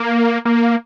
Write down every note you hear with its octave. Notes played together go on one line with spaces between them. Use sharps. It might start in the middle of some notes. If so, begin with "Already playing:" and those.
Already playing: A#3
A#3